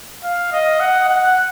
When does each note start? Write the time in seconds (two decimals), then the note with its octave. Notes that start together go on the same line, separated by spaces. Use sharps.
0.24 F5
0.52 D#5
0.80 F#5
1.09 F#5